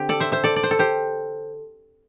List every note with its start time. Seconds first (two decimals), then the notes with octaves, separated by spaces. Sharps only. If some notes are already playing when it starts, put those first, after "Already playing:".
Already playing: D3 C4 G4
0.09 A4 D5
0.20 C5 E5
0.32 C5 E5
0.44 A4 D5
0.56 D5
0.63 C5
0.71 A4
0.79 G4 C5